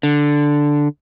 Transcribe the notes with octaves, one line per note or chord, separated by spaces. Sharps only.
D3